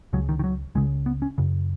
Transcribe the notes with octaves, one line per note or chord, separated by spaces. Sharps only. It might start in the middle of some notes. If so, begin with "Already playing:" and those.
C#2 C#3 F#3
D#3
D#3
F#3
C#2 C#3 G#3
B3
C#4
F#2 C#3